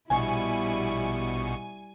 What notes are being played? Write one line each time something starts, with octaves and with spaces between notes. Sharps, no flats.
A#1 B2 G3 E4 G#5 C#6